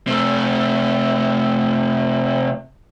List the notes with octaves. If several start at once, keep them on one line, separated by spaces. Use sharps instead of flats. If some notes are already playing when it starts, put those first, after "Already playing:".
C3 A3